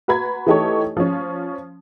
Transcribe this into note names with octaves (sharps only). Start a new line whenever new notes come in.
F#4 B4 A#5 B5 G#6
E3 A3 D#4 G4 A4 C#5
F3 C#4